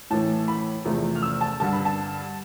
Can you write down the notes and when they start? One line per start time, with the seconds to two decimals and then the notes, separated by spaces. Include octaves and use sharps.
0.10 A2 E3 A3 A5
0.48 B5
0.85 E2 C3 F3 A3
1.16 F6
1.22 E6
1.41 A5
1.60 G2 D3 G3 A5
1.73 B5
1.85 A5